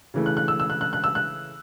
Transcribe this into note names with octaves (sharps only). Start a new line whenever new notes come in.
C#3 E3 A3
F#6
F#6
E6
E6
F#6
F#6
F#6
E6
F#6